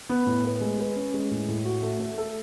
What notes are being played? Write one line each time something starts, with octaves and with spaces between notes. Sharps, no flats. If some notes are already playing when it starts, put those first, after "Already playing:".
B3
A2
B4
G#3
B4
C#4
G#3
A2
A2
F#4
A3
A3
A4